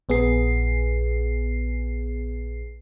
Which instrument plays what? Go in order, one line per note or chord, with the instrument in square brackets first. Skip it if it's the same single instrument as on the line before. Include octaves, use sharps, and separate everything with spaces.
[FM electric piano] A#1 B3 G#4 C7